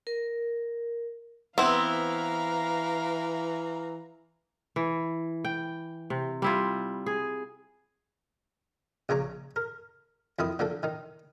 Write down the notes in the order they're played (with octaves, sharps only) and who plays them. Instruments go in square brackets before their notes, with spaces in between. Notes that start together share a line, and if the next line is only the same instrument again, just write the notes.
[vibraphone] A#4
[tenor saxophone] E3 [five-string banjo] B3 C4 E4 [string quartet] F5 A#5
[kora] E3
G5
C3
G3 E4 F4
G#4
[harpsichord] A#1 C#3 C#5 A#5 D6
A#4
F2 D#3 E4 D#6
D3 F3 A#3 D4 A4
D#3 D#4